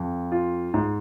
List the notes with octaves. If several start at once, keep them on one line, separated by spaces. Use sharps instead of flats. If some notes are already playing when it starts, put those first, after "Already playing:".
Already playing: F2
F4
G#2